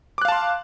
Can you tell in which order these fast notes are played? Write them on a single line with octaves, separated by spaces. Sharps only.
D6 F#6 F5 A5 C6